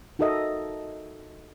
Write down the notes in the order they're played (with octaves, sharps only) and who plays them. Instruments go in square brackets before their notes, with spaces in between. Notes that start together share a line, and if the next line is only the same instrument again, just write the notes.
[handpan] D#4 F#4 A4 A#4 D#5 E5